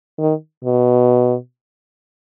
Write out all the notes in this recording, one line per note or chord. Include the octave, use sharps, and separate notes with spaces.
D#3
B2